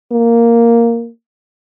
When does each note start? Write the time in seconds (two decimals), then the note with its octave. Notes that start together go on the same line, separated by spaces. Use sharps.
0.12 A#3